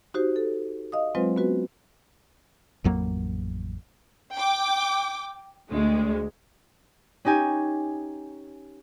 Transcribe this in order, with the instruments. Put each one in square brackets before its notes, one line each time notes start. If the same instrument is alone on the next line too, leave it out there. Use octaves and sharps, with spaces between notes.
[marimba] D#4 F#4 G4 C5
A4
D#5 F5 D#6
F#3 G#3 C4 F4 B4 C5
B3 C#4 F#4 B4
[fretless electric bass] A1 F2 F#3 A#3
[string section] G5 D6
D2 G#3
[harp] C#4 D#4 G4 G#5